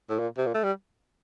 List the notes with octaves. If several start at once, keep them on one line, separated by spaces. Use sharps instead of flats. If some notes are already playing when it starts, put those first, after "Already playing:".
A2
A#2
C3
A#2
A3
G3